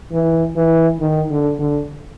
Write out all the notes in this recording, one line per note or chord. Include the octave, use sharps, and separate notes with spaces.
E3
E3
D#3
D3
D3